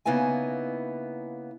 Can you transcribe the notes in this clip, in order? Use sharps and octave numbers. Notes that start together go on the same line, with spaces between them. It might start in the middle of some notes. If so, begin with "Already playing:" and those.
C#3 A#3 B3 D#4 E4 G#5